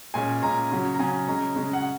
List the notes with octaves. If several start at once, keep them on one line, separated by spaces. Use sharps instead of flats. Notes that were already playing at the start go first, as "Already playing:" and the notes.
A#2 G#3 C#4 G#5
A#2 G#3 C#4 A#5
C#3 F#3 C#4
A#5
C#3 F#3 C#4 G#5
C#3 G#3 C#4 A#5
C#3 G#3 C#4
F#5